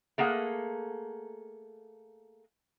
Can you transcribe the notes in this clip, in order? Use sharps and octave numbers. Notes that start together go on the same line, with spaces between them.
A3 A#3 G#4 F#5